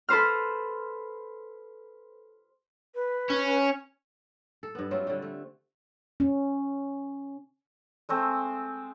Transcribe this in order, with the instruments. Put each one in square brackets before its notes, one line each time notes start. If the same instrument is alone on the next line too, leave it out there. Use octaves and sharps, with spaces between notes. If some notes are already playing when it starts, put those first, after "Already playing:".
[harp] A4 B4 C5 F6
[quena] B4
[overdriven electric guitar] C#4
[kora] A4
G2 B3
F#3 A3 C4 F4
D3 G3
A3
[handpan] C#4
[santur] G#3 A3 C4